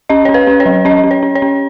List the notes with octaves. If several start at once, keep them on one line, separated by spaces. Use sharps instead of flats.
C#4 D#5
C#4 C#5
B4
C#4
C#5
F#3
C#4 D#5
C#4
C#5
C#4
C#5
C#4